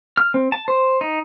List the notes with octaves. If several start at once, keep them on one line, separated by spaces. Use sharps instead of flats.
F6
C4
A5
C5
D#4